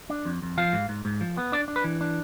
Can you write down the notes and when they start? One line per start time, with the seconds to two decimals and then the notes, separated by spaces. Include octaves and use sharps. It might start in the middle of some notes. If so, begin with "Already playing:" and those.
0.10 D4
0.25 F2
0.42 F2
0.58 F3 F5
0.73 G#2
0.89 G#2
1.05 G#2
1.21 F3
1.37 B3
1.52 D4 D5
1.68 D4
1.76 B4
1.84 E3
2.01 D4